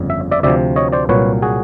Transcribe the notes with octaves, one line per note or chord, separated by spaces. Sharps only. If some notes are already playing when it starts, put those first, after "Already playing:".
Already playing: G1 F2 C#3
E5
D5 E5
D2 C3 F3 D5 E5
C#5 D#5
C5 D5
C2 A#2 F#3 B4 C#5
F#4 G#4